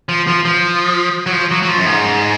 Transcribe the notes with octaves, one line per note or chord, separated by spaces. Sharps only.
F3
F3
F3
F#3
F3
F#3
F#3
F3
F#2
G#2